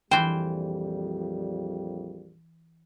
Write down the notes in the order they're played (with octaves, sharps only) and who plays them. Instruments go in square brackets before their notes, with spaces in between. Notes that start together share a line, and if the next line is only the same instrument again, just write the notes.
[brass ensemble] A#1 F2 G3 [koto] E3 C5 [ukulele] G5